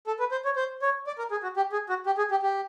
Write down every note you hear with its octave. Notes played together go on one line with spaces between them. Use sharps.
A4
B4
C5
C#5
C5
C#5
D5
A#4
G#4
F#4
G4
G#4
F#4
G4
G#4
G4
G4